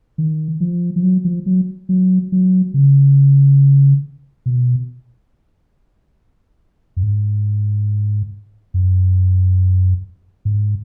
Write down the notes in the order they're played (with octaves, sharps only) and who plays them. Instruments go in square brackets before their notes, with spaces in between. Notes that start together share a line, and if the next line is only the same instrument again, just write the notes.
[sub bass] D#3
F3
F3
F#3
F3
F#3
F#3
F#3
C#3
B2
F#2
G#2
F#2
G#2